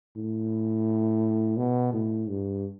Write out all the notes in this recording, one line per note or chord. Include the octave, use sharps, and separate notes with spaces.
A2
B2
A2
G2